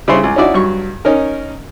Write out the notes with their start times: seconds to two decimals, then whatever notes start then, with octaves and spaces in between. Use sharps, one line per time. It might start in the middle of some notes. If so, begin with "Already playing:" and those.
0.08 C#3 G3 C#4 E4 C5 C#5
0.23 C#2
0.36 C#4 D#4 E4 F#4 D5
0.54 G2 F#3 C#6
1.05 C#4 D#4 A#4